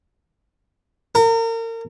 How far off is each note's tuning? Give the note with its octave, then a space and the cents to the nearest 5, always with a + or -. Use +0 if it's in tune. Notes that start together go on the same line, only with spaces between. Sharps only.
A#4 -35